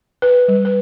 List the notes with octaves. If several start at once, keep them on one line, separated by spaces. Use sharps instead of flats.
B4
G3
B4